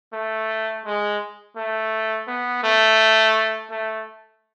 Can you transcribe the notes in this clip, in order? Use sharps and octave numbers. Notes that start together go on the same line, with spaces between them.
A3
G#3
A3
B3
A3
A3